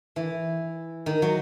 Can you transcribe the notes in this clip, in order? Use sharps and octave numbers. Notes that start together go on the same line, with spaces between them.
E3
D#3
F#3